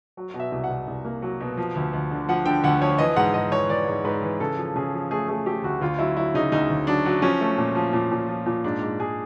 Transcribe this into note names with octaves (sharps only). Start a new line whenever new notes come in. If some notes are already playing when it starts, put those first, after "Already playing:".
F#3
B2
E5
C2
F#5
C2
C2
A#3
F#3
B2
F3
D2
D2
D3
F3 F#5
D3 G5
D2 F#5
F3 C#5
E3 D#5
G#2 F#5
G#2 D#5
E3 C#5
E3 D5
G#2
G#2 B4
E3
C#3 A4
F3
C#3 G#4
F3
A3 G#4
A3 G#4
A3 G4
D2 F#4
D2 F4
F#3 E4
F#3 E4
C#3 D#4
D2 D#4
D2
F#3 D4
F#3
F3 C#4
A3
A#2
F3
A#2
A#2
F3
A#2
G#2 D4
G#2
G#2 G#4